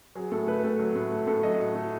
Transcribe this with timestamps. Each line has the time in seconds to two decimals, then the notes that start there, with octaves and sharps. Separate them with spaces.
0.15 F#3 G#4
0.31 A2 A4
0.47 A3 B4
0.64 A2 A4
0.79 F#3
0.95 A2
1.11 A3
1.27 A2 A4
1.43 F#3 D#5
1.59 A2
1.75 A3